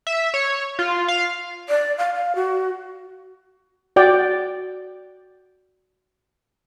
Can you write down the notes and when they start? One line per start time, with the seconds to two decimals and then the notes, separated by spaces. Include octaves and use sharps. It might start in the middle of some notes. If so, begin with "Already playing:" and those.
0.07 E5
0.34 C#5
0.79 F4
1.08 F5
1.68 D5
1.98 F5
2.15 F5
2.35 F#4
3.96 F#4 D5 G5